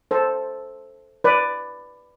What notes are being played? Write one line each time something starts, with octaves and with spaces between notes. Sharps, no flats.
A4 C5
B4 D5